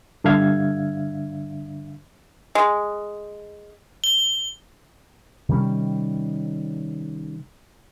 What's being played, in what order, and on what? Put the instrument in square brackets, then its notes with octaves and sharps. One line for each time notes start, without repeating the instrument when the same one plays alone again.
[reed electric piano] G2 D3 D4 E5 F5 G#6
[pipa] G#3
[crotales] G7
[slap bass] C3 D#3 G3 C#4